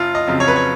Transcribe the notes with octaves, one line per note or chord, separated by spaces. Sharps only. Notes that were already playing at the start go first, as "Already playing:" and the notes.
Already playing: F#1 F4
D#5
F2 C#3 F#3
C#5
B4
C#5